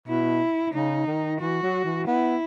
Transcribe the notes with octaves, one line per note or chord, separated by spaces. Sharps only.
B2 E4
C#3 D#4
D#3
E3 F#4
F#3
E3
B3 E4